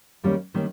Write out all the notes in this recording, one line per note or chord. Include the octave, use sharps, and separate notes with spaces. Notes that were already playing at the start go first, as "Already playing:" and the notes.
D#2 D#3 G3 A#3 C#4
D#3 G3 A#3 C#4